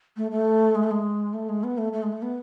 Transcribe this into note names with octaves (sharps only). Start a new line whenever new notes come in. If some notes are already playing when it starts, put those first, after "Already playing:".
A3
A3
G#3
A3
G#3
A3
G#3
B3
A3
A3
G#3
A3
B3